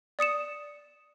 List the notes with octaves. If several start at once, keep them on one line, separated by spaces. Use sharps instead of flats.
D5 D#6 C#7 E7